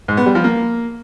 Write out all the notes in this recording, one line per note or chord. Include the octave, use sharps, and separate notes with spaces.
G#2
B3
G3
F3
A#3